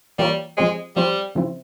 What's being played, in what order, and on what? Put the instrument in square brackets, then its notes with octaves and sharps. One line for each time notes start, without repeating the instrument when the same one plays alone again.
[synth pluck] E3 A#3 F4 A#4 C#5 [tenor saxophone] G3
[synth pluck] F3 C4 G4 C5 [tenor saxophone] G#3
[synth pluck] F3 C4 G4 C5 [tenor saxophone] G3
[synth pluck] C#3 F3 C4 E4